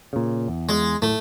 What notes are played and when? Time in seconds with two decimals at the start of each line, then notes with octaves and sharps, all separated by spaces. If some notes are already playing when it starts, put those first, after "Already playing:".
0.13 A#2 C#3
0.48 E2
0.69 G#3
1.02 A2 A3